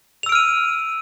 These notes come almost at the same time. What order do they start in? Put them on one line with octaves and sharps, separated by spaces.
F7 E6 D7 F6 D#7